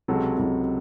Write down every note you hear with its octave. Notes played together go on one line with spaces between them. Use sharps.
C#2 C3 F#3 A4
C#2 C3 F#3